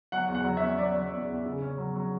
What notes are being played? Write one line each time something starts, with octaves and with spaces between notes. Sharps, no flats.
F#3 F#5
E2
F#5
F#3
E5
C#4
F#3 D5
F#3
E2
E2
C#3
C#4
F#3
F#3